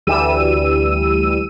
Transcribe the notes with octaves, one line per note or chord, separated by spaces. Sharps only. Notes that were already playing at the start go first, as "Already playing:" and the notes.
D2 E3 G3 E6 D#7